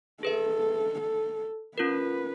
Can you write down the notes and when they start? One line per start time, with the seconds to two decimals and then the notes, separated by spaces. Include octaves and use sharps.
0.23 G#4 A4 B4 E5
1.00 A4
1.77 C#4 F4 A#4 B4